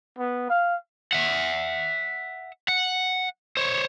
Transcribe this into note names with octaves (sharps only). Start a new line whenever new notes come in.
B3
F5
E5 F#5
F#5
C5 C#5